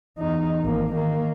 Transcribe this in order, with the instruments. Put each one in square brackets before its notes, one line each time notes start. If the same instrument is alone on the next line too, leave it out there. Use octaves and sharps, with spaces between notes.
[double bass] E2 D#4
G#1 A#3
D#3 A#3